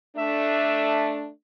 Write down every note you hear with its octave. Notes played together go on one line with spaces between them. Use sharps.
A3 D4 E5